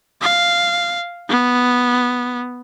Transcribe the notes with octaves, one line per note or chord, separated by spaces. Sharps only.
F5
B3